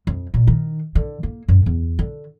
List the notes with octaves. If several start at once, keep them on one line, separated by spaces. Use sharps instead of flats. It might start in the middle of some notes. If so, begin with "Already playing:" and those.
F2
A#2
D#3
D3
A#3
F#2
E2
D3